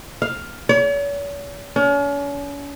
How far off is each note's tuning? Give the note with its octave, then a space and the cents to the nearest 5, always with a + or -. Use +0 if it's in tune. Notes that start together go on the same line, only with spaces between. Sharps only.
F5 +5
C#5 +45
C#4 +40